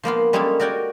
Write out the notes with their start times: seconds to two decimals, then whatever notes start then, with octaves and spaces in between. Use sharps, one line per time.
0.03 F3 A#3 B3 F4
0.33 G3 G#3 A#3 C#4 G#4 A4
0.60 F#4 A#4 D5 G5 G#5